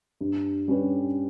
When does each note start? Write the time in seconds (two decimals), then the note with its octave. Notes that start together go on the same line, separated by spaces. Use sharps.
0.21 G2
0.68 G3 C#4 G4 B4